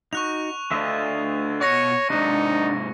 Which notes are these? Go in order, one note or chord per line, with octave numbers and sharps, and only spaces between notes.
D#4 F#4 C#6 F#6 F7
D2 D3 F4 D#5 E5
B2 C#5 F#5 C#6 A#6 C#7
G#2 C3 D4 D#4